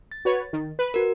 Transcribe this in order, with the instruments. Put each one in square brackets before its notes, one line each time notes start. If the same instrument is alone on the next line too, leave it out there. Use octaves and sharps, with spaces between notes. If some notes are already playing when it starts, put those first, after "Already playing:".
[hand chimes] A6
[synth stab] F#4 B4 C#5
D#3
B4
[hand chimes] F#4 A#4